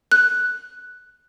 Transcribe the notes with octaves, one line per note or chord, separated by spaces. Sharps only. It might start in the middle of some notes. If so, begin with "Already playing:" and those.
F#6